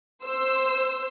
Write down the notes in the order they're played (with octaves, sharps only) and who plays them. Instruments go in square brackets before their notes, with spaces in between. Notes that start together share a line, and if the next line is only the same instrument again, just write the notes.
[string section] C5 E6